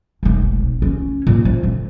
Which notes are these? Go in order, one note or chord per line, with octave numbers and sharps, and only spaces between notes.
E1 B1
C#4
A#2
F3
D3